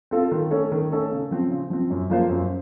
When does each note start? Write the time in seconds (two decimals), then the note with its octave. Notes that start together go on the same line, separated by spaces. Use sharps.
0.11 C4 F4 A4
0.31 D#3
0.51 A3 C#4 A4 C#5
0.72 D#3
0.91 A3 C#4 A4 C#5
1.11 C#3
1.31 F3 C4
1.50 C#3
1.70 F3 C4
1.90 F#2
2.10 F3 A#3 F4 C5
2.29 F#2